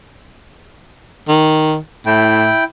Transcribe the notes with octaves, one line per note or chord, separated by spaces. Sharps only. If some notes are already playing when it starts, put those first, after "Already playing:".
D#3
A2 E4 G5